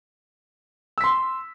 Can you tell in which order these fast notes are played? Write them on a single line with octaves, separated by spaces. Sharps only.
E6 B6 C6